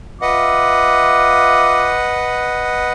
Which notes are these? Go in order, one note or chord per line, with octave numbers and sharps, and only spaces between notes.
F4 B4 D#5 E5 F#5 D6